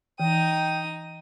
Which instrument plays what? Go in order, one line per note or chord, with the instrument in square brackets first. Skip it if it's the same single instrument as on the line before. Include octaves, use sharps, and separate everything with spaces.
[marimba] E3 [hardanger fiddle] D#4 D#6 [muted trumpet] G5